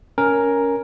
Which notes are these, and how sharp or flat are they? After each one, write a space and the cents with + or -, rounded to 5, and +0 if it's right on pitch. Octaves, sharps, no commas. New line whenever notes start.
C#4 +15 A#4 +5 G#5 +0